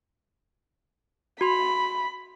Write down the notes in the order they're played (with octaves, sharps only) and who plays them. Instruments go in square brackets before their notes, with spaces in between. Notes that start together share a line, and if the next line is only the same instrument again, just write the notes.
[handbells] F#4 C6 [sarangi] B5